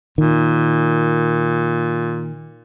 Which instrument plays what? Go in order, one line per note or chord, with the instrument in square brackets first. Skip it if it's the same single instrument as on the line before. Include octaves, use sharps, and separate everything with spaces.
[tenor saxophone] A#2 [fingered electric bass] D#3